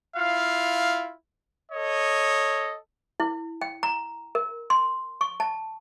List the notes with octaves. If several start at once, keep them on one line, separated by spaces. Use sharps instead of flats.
E4 F4 F5
A4 C#5 D#5
E4
G5
A#5
A#4
C6
C#6
A5